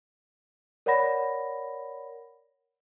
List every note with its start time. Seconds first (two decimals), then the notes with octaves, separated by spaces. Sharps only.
0.86 A#4 C#5 D5 F#5 B5 A#6